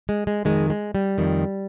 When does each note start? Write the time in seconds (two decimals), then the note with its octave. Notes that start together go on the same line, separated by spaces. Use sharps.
0.09 G#3
0.27 G#3
0.45 F2 D#3 G#3
0.70 G#3
0.95 G3
1.18 F2 D#3